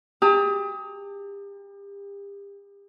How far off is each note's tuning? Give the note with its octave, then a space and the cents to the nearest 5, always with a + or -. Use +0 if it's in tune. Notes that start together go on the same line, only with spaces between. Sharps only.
G4 +35 A5 +30 D#6 +30